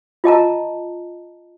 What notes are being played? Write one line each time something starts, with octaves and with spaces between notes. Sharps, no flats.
F4 D#5 A5 A#5